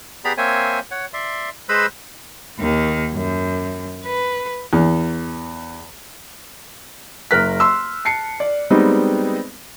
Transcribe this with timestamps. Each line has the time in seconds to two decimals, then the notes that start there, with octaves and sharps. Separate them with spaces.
0.25 B3 G4 G#4 D5 A#5 B5
0.38 A#3 C4 C5 C#5 E5 G#5
0.91 C#5 F#5
1.13 D5 E5 C6
1.69 G#3 B4 C5 D#5 B5 E6
2.59 D#2 D#3
3.12 F#2
4.06 B4
4.73 E2
7.31 F#1 A#4 F6 F#6 B6
7.60 C6 E6
8.05 A5 C7 C#7
8.40 D5
8.70 G3 G#3 B3 C4 D#4